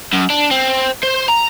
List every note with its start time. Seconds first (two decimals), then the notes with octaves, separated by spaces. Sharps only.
0.13 F#2
0.30 D4
0.51 C4
1.03 C5
1.29 A#5